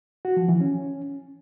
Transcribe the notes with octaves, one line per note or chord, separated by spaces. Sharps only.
F#4
F3
E3
C#4